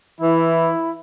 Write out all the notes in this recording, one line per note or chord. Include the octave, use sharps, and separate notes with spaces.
E3 E4